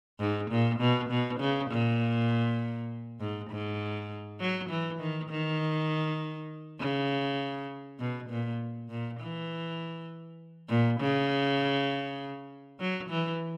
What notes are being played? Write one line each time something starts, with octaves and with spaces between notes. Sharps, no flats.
G#2
A#2
B2
B2
C#3
A#2
G#2
G#2
F#3
E3
D#3
D#3
C#3
B2
A#2
A#2
E3
A#2
C#3
F#3
E3